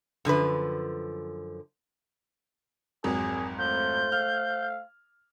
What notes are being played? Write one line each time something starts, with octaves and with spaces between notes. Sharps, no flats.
F#2 D3 F3 B4
G#1 F2 F#3 G#4
A3 F4 C5 G6
F5 F6